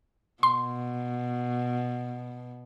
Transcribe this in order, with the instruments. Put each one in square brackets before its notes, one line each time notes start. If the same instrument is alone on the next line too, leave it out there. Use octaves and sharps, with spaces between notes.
[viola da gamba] B2 [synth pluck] C6